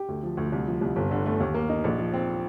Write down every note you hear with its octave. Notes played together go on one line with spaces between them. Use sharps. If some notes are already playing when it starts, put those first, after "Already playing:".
Already playing: G4
D2
F3
D2
C2
F3
C2
G1
D3
A3
D#2
A#3
D#4
A#1
F3
C4